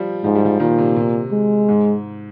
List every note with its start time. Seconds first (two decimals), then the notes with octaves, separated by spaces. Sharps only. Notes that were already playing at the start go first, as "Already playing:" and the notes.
Already playing: F3 G3
0.24 G#2 F3
0.35 G3
0.45 F3
0.60 A#2 D#3
0.78 C3
0.96 C3
1.32 G#3
1.69 G#2